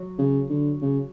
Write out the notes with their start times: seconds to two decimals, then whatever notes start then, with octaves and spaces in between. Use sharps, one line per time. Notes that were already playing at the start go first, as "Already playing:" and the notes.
Already playing: F#3
0.19 C#3
0.50 D3
0.82 C#3